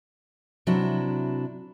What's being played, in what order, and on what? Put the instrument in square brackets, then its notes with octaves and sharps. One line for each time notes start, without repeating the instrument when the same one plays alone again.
[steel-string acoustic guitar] C3 F#3 D4 E4